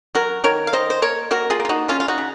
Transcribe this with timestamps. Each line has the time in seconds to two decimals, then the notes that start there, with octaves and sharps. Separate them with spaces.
0.15 F#3 F#4 A#4
0.44 D#3 A#4 C#5
0.67 F5
0.73 D#3 C5 D#5
0.90 C5
1.02 A#3 A#4 C#5
1.31 A#3 F#4 A#4
1.50 F4 G#4
1.60 A#3
1.65 F4
1.69 D#4 F#4
1.88 C#3 C#4 F4
2.00 F4
2.08 D#4 F#4
2.18 C#3